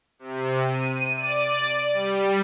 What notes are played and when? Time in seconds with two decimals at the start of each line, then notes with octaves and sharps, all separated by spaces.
0.19 C3
0.65 D#7
1.18 D5
1.93 G3